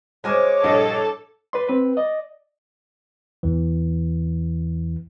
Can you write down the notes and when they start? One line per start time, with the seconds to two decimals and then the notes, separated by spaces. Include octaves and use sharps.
0.24 G#3 C#4 A#4 C5 C#5 G#5 D6 F6
0.64 A#1 G2 E3 A4 D#5
1.53 B4 D5 C6
1.69 C4 B4
1.97 D5 D#5
3.43 E2 E3